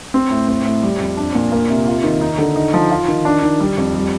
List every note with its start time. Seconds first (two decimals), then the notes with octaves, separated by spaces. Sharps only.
0.14 C4
0.31 A2
0.48 C4
0.65 A2
0.82 G3
1.00 F2
1.17 D4
1.35 A#2
1.52 A#3
1.70 C3
1.87 F4
2.04 D#3
2.21 D#4
2.38 D3
2.56 D#4
2.74 F3
2.90 F4
3.08 D#3
3.25 D4
3.42 D#3
3.60 G3
3.78 F2
3.95 G3